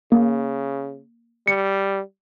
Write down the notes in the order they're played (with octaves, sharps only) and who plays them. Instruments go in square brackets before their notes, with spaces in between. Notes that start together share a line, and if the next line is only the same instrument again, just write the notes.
[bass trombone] C#3 [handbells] A#3
[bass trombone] G3 [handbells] C#7